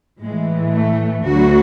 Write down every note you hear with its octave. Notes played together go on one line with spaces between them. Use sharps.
A2 E3 G#3
A3
D2 D3 F#3 F#4